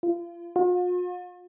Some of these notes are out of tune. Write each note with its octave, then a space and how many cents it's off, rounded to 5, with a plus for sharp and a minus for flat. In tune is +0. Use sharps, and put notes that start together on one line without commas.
F4 -30
F4 +45